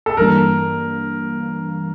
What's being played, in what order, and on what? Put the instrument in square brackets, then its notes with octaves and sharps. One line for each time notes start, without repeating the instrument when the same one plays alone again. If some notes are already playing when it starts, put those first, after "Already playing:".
[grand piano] A4
[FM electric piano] G2 E3 G3 A#3 D4 [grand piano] A#4